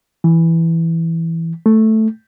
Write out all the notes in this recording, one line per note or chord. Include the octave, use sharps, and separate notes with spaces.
E3
A3